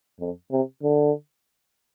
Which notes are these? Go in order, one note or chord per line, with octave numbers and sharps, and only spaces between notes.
F2
C3
D3